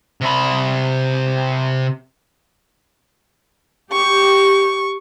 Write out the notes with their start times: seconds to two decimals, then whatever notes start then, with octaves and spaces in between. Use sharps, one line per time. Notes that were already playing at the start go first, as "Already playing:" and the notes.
0.21 C3 B5
3.92 G4 C#6